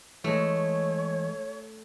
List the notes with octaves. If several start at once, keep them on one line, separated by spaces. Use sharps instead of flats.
E3 G#3 A3 C#5